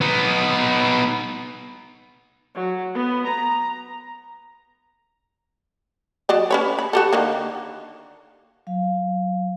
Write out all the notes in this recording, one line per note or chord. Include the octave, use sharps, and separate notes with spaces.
B3 D#4
F#3
B3
A#5
F#3 D5 D#5
C#4 B4 C#5
B5
F#4 G4 A4
D3 D#3 A#3
F#3 F5